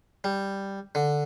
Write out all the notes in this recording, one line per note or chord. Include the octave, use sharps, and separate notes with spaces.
G3
D3